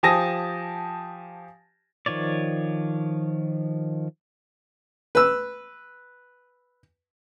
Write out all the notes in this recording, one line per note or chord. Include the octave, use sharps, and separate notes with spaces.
F3 G4 G#5 A5 D#6 A#6
D#3 F3 C#5 D5
B4 E6